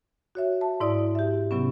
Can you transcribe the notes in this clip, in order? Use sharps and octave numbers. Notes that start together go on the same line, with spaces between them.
F#4 C#5 E5
E5 A5
G#2 E4 D5 D#6
G4 E5
C3 F#3 B3 C#4